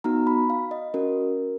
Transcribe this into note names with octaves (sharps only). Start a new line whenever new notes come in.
B3 D#4 F#4 A#5
B5
F5
D#5
C#4 F#4 A#4